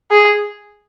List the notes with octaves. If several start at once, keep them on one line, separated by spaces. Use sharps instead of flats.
G#4